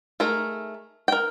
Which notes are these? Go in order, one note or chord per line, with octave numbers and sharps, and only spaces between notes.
A3 D#4 G#4 A#4 A#5
A#4 G5